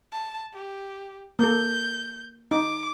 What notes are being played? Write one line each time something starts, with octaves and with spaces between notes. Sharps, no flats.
A5
G4
A#3 A4 G6
D#4 D6